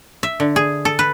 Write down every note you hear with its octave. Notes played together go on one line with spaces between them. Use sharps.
E5
D3
G#4
A4
B4